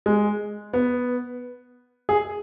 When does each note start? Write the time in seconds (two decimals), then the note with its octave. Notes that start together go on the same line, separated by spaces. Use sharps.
0.06 G#3
0.73 B3
2.09 G#4